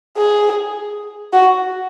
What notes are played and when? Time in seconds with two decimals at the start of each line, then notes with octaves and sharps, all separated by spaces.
0.17 G#4
1.33 F#4